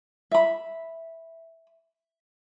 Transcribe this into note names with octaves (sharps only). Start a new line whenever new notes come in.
E5 B5